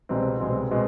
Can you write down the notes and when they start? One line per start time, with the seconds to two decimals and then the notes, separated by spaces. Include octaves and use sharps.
0.09 C2 B2 G#3 C4
0.40 C2 B2 G#3 C4
0.71 B2 G#3 C4